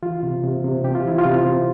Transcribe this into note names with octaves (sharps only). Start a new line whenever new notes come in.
E3 F4
C3
C3
C3
C3 G4
F4
E3 E4
F4
C3
C3